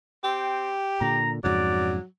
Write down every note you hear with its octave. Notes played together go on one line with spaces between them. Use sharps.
C4 G4
A#2 D3 A#5
F2 G#2 C#3 F#3 D5